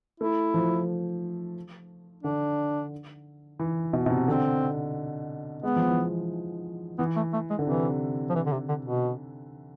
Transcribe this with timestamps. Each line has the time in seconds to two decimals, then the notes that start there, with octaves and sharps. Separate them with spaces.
0.20 A3 E4
0.54 F3
2.24 D3 D4
3.59 E3
3.93 B2
4.06 B2
4.10 C3
4.27 D3 C4
5.63 G#3 B3
5.76 F3
5.89 E3
6.01 F3
6.98 E3 B3
7.16 A3
7.33 A3
7.50 G#3
7.59 D3
7.67 C3 E3
8.30 F3
8.35 E3
8.46 D3
8.52 C3
8.69 D3
8.85 B2